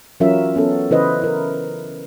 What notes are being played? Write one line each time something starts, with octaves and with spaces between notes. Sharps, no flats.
E3 F#3 C#4 F4 A#4 E5
B3 C#4 A4
C#3 E3 E4 B4 C5 D#5
E4 A#4